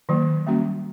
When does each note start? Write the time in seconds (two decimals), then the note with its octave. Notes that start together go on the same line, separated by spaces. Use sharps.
0.09 D#3 F#3 A#3
0.47 G3 A#3 C#4 F#4